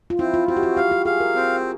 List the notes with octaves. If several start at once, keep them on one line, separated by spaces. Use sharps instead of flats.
F4
C4 E4
F4
C4 F#4
G4
F#4
G4 F5
G4
G#4 F5
A#4
C4